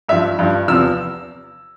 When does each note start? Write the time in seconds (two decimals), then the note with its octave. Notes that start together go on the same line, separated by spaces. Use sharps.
0.09 G2 E5
0.12 F3
0.39 G2 F3
0.68 E2 C3 F3 E6